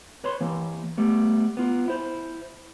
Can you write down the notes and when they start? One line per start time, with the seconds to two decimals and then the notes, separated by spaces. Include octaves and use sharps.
0.24 B4 C#5 C6
0.40 E3 A#3
0.97 G3 A3 B3
1.57 B3 F4
1.88 E4 C5